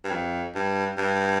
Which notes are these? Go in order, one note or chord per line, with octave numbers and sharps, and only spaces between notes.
G2
F2
G2
G2